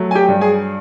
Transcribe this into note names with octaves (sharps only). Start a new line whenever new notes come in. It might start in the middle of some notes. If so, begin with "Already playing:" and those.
Already playing: F#3 A3
G#5
G4 G5
G2
G#4 G#5